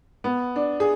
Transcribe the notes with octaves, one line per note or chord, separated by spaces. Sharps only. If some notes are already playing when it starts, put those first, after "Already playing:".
B3
D4
G#4